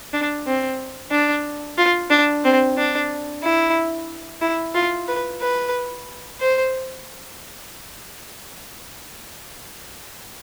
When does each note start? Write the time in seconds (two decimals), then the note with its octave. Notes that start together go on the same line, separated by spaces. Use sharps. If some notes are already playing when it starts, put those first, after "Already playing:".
0.13 D4
0.46 C4
1.11 D4
1.78 F4
2.10 D4
2.44 C4
2.77 D4
3.43 E4
4.41 E4
4.74 F4
5.08 B4
5.41 B4
6.40 C5